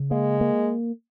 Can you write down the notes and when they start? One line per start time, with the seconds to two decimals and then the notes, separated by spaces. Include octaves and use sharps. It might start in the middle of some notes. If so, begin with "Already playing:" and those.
Already playing: C#3
0.11 G#3 A#3
0.41 A#3